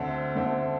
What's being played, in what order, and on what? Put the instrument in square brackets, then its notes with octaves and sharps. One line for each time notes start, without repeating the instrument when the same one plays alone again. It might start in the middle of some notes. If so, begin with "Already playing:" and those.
Already playing: [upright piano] D2 D3 C4 A4 E5
D2 D3 C4 A4 E5